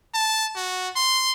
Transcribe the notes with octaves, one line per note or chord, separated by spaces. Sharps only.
A5
F#4
C6